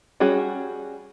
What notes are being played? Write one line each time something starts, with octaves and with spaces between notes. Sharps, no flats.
G3 C#4 F#4 G#4